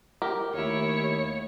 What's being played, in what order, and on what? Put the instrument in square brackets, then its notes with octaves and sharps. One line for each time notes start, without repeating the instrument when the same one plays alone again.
[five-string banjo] G4 A#4
[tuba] D#2 [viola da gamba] A3 E4 [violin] C#5 C#7